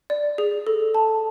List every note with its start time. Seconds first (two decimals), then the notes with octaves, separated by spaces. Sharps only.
0.10 D5
0.38 G#4
0.67 A4
0.95 A5